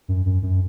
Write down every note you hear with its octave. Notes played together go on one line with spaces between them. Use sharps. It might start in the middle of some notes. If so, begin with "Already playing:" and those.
F#2
F#2
F#2